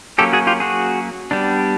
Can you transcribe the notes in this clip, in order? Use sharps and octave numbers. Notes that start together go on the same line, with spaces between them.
F#3 A#3 C#4 G4 A4
F#4 G#4
F4 G4
F#4 G#4
G3 B3 D4